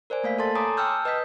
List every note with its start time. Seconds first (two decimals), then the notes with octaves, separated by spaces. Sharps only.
0.10 A#4 C5 D5 G#5
0.24 A3 A#3 F5 B6
0.38 A4 A5 C6 A6
0.55 C#5 G#5 A#5 C6 D6 D#6
0.77 G5 A5 E6 F6 G6
1.05 B4 D#5 D#6 G6 B6